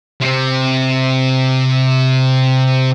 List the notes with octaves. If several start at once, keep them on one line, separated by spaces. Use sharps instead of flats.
C3 C4